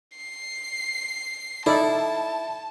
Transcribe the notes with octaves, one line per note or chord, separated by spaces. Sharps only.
C7
D#4 E4 A4 D5 A5